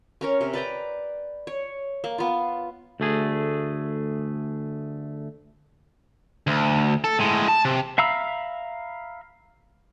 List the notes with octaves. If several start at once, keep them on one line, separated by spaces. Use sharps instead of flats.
C#4 A#4 C#5
C3
B4 D5 G5 A#5
C#5
A#3
B3 F4
D2 A3 G#4
D2
A4
A2 G#3
A5
C3
E5 F5 A#5 B5 E6